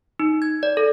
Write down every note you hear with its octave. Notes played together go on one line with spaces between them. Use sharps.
D#4
G#6
D5
A4